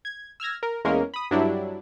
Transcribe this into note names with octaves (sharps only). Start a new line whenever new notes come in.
G#6
E6 F6 G#6 A#6
A#4
E2 G#3 A#3 C#4 A#4
B5 D#6
G2 F#3 G3 D4 E4